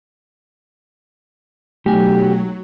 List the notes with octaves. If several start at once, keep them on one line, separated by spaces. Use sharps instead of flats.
B1 F#3 A3 G4 G#5